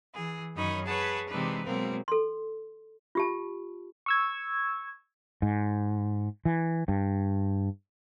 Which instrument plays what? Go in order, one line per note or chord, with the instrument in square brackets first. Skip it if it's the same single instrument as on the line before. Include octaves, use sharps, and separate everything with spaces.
[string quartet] E3 G#4
F#2 D#3 D#4 C#5 D#5 B5
G#4 B4 C#5 F#5 A5
C3 E3 G#3 D4 D#4 B4
B2 F#3 G#3 A#3 C4
[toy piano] A4 C6
F4 G4 A5
[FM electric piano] C#6 E6 G#6
[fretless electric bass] G#2
E3
G2